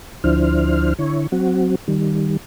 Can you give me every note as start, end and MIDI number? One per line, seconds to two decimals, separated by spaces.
0.24 0.93 38
0.24 0.93 53
0.24 0.93 62
0.24 0.93 64
0.24 0.93 72
0.24 0.93 89
0.99 1.27 50
0.99 1.27 64
0.99 1.27 73
1.32 1.75 54
1.32 1.75 60
1.32 1.75 66
1.88 2.37 51
1.88 2.37 55